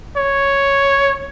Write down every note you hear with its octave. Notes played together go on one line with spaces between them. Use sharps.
C#5